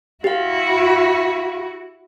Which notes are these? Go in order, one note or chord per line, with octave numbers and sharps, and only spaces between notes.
E4 F#4 G4 F5